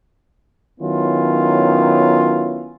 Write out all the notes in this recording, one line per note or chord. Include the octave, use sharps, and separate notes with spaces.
D#3 F#3 B3 C#4 E4 F4